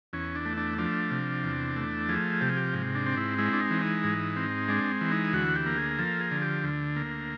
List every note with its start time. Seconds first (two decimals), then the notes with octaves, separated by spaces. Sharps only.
0.13 E2 C#4
0.35 D4
0.45 A3
0.57 D4
0.78 F3 D4
1.11 C3
1.44 E2
1.76 A3
2.09 F3 G#4
2.41 C3 G4
2.49 G#4
2.57 G4
2.73 G#2
2.95 D4
3.06 C4
3.17 E4
3.38 G#3 E4
3.53 D4
3.60 D#4
3.71 E3
3.82 D#4
4.04 G#2
4.36 C4
4.68 G#3 D4
5.01 E3
5.11 D#4
5.33 D2 F#4
5.55 G4
5.66 A#3
5.77 G#4
5.99 F3 A4
6.20 G#4
6.31 D3
6.42 G4
6.64 D2
6.96 A#3